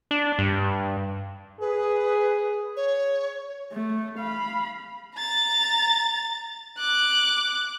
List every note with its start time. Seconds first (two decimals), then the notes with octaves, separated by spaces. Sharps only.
0.11 D4
0.39 G2
1.61 G#4 B4
2.77 C#5
3.72 A3
4.18 F5 B5
5.16 A#5 A6
6.79 D6 F#6